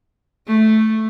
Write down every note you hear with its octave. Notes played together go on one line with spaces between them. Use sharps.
A3